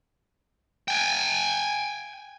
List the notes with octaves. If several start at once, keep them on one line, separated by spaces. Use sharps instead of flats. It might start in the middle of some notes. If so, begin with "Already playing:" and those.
G5 G#5